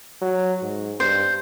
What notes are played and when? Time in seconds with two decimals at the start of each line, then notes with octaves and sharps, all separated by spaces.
0.21 F#3
0.62 G#2
1.00 G2 C5